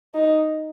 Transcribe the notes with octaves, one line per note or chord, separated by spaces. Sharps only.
D#4